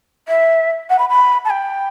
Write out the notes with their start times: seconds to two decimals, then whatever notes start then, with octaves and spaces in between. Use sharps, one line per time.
0.28 E5
0.89 F#5
0.99 B5
1.09 B5
1.45 A5
1.50 G5